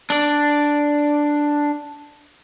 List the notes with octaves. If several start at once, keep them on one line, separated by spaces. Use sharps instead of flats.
D4 D5